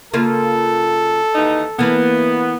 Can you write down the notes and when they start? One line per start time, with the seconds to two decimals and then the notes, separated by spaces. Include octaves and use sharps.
0.14 C#3 A#3 F4 A4
1.35 D#2 E3 D#4
1.79 E3 A#3 B3